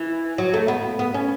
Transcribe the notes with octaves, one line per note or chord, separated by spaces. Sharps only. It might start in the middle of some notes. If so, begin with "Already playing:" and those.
Already playing: E3
F#3
A3
B3
B3
C#4